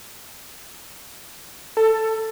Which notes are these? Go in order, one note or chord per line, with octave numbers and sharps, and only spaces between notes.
A4